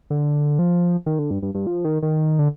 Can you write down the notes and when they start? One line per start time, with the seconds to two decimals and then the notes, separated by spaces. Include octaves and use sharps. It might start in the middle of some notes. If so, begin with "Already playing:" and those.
0.10 D3
0.59 F3
1.06 D#3
1.19 D3
1.31 G2
1.42 G2
1.55 G2
1.67 F3
1.85 D#3
2.03 D#3
2.39 D3